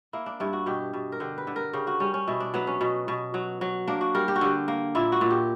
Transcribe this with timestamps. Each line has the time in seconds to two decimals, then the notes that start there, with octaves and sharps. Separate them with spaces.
0.13 A#3 E4
0.26 D4
0.40 G2 E4
0.53 F#4
0.66 B2 G4
0.93 B2
1.12 A#4
1.20 D3 G4
1.38 B4
1.47 D3
1.56 A#4
1.73 C#3 G4
1.87 F#4
2.00 G3 C#4
2.14 C#4
2.27 B2 E4
2.40 D4
2.54 F#3 B3
2.67 C#4
2.81 B2
3.08 B2
3.34 F#3
3.61 F#3
3.88 A#3 D4
4.01 F#4
4.15 G3 A#4
4.28 G4
4.36 F#4
4.41 D3 G4
4.68 A#3
4.95 A#2 E4
5.12 F#4
5.21 A#2
5.30 G4